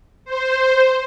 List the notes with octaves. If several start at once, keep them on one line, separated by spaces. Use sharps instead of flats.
C5